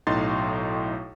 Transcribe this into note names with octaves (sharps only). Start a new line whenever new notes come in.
B1 A2 D#4 C6 A6